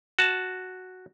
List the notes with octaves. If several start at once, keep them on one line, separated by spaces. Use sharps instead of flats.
F#4 A5